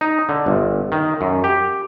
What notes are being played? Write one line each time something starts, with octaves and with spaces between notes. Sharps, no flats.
D#4
D3
G1
D#3
F#2
G4